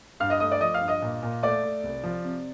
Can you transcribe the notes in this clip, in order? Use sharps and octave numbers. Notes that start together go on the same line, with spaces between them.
G2 F5 F6
D#5 D#6
A3 D#5 D#6
D5 D6
F3 D#5 D#6
F5 F6
G2
D#5 D#6
A#2
A#2
A3 D5 D6
A3
C2
F3
C3